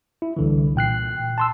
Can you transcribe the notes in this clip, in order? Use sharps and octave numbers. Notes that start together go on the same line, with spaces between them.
E4
C2 D3 E3
A#2 G5 F#6 C7
A5 C6 E6